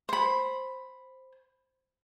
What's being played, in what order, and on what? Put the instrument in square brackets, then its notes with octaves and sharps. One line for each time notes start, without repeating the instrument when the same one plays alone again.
[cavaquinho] C5 B5